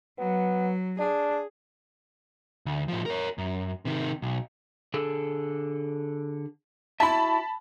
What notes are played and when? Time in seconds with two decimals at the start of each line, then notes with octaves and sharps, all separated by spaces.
0.18 F#3 B3
0.99 D4 G#4
2.66 D2
2.88 A2 F3
3.06 A#4 C#5
3.38 F#2
3.85 C3 D#3
4.22 B1
4.94 D3 G#4 A4
7.00 E4 F#4 E5 A5 B5